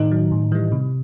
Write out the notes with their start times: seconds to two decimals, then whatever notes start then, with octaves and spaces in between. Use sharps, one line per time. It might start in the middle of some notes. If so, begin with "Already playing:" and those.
Already playing: A2 D#3 D#4
0.11 F#3
0.31 A2
0.52 E3 G3
0.72 C3